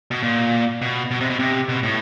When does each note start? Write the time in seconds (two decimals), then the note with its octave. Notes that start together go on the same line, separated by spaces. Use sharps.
0.11 B2
0.23 A#2
0.81 B2
1.11 B2
1.21 C3
1.30 B2
1.39 C3
1.69 B2
1.83 A2